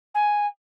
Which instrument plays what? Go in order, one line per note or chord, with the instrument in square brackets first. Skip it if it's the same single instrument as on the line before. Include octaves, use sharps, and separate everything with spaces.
[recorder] G#5